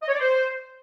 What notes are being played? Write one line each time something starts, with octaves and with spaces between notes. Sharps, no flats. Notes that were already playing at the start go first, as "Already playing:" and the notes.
D#5
C#5
D5
C5